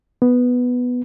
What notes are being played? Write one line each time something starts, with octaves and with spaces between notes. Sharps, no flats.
B3